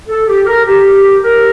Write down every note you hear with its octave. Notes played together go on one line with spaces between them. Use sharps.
A4
G4
A#4
G4
A#4